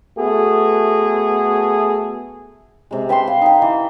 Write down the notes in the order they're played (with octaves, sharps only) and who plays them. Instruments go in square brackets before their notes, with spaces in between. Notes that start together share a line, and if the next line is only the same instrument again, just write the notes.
[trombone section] A3 B3 F#4 G#4 A4
[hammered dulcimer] C3 G#3
B4 G5 A5 C6
F5
D#4 G5
E3